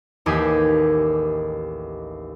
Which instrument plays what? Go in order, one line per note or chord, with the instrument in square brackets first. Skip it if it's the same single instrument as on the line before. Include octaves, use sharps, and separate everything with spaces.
[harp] A1 D#2 G4 G#4 G#6 B6